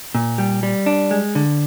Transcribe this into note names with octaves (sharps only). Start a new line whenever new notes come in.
A#2
G3
G3
D4
G#3
D3